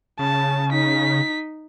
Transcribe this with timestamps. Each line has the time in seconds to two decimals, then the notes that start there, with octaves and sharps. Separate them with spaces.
0.19 C#3 A5
0.70 D#4 B6